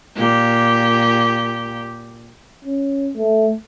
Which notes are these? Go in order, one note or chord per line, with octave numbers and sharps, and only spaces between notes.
A#2 G4
C#4
A3